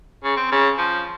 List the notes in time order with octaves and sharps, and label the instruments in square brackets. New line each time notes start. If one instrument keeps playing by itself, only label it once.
[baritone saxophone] C#3
C4
C#3
F3